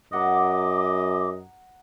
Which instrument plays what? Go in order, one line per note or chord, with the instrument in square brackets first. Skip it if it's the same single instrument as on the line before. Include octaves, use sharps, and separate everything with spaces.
[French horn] F#2 [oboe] D#5 [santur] F#5 A#5 [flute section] D6